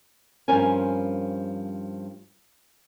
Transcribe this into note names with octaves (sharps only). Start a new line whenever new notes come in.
G2 F3 C4 C#4 A#4 G#5